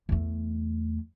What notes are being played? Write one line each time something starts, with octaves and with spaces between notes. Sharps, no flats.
E2 A3